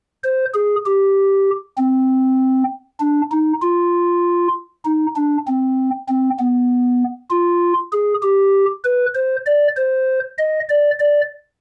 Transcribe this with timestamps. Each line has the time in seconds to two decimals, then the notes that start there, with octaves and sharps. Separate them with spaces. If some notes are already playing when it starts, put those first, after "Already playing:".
0.24 C5
0.54 G#4
0.86 G4
1.78 C4
3.00 D4
3.31 D#4
3.62 F4
4.85 D#4
5.16 D4
5.47 C4
6.08 C4
6.39 B3
7.30 F4
7.93 G#4
8.23 G4
8.85 B4
9.15 C5
9.46 D5
9.77 C5
10.38 D#5
10.69 D5
11.00 D5